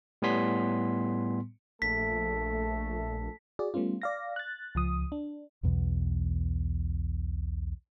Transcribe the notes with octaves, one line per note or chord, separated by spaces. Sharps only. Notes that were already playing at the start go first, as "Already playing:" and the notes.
A2 G3 B3 G#5 C6 B6
A#1 A3 A4 B6
F#4 G#4 D5
G3 A3 B3 C#4 F4
D5 F5 A#6
F#6 A6
C#2 F3 D#6
D4
B1 E2 B2 E3